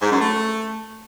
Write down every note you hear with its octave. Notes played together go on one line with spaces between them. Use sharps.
G#2
F#2
A3